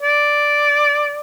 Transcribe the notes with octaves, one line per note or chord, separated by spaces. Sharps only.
D5